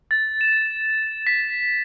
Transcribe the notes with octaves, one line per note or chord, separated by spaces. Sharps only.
A6
E7
B6